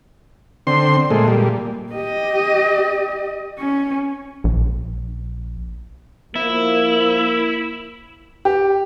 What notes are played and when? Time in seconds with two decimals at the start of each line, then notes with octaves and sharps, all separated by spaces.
0.67 D3 C4 C6
1.10 A#2 G#3 A3
1.28 A#2 G3
1.92 G4 D#5
3.59 C#4
4.44 A#1
6.36 F3 A#3 E4
8.45 G4